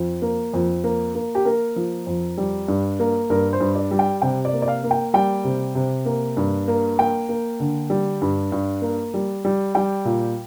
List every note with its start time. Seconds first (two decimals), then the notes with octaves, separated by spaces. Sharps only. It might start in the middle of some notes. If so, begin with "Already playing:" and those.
Already playing: F2
0.22 A#3
0.54 F2
0.84 A#3
1.15 A#3
1.35 G4
1.45 A#3 A#4
1.76 F3
2.07 F2
2.38 G3
2.68 G2
3.00 A#3
3.30 G2 A#4
3.53 C5
3.60 G2
3.75 D5
3.91 G3
3.99 G5
4.22 C3 G5
4.45 D5
4.53 A#3
4.62 D5
4.68 F5
4.84 A#3
4.91 G5
5.14 G3 G5
5.44 C3
5.75 C3
6.06 A#3
6.37 G2
6.68 A#3
6.99 A#3 G5
7.29 A#3
7.60 D3
7.90 G3
8.22 G2
8.52 G2
8.82 A#3
9.14 G3
9.45 G3
9.75 G3 G5
10.05 A#2